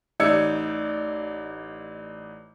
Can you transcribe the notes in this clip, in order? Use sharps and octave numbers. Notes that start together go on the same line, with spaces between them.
A1 D#4 D5 E6 G#6 C#7